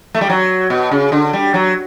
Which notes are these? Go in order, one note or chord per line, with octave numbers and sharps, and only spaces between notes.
A3
G3
F#3
B2
C#3
D3
G3
F#3